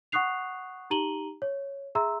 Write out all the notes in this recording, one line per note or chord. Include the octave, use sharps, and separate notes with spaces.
F#5 C#6 D#6 F#6 C7 F7
D#4 G4 A#5 D#7 F#7 G7
C#5
G#4 E5 A#5 C6 E6